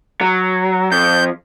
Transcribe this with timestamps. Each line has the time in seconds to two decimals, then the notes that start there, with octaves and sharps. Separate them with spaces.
0.21 F#3
0.92 F2 G6